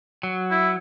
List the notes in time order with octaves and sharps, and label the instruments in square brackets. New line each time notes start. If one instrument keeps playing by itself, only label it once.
[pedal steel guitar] F#3
[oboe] E4